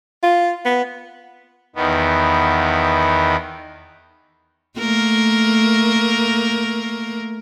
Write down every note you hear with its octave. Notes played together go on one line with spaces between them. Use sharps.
F4
B3
E2 D#3 B3
A3 A#3 A#4